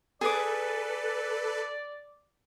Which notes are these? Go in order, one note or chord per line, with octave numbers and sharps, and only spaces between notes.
G#4 A4 B4 D5 D6